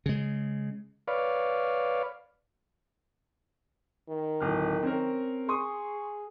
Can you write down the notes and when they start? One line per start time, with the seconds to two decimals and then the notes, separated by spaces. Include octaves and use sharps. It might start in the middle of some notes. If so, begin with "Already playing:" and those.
0.06 C#3 G#3
1.08 B4 C#5 D5 F5
4.09 D#3
4.40 D1 F6
4.83 C4 C#4 A#4
5.49 G#4 C6 C#6 D#6